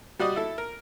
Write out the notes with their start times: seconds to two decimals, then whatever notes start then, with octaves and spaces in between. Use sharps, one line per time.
0.19 G3 F#4 D5 D#5
0.36 E4 A4
0.58 A#4